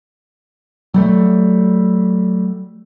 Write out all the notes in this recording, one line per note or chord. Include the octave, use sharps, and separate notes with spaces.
F#3 G3 A3